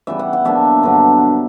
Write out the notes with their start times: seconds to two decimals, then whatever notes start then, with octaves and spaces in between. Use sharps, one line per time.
0.07 C#3 E3 G3 B3 E5
0.19 F#5
0.33 F#5
0.45 B2 F#3 A#3 D4 E5
0.83 G2 D3 F#3 B3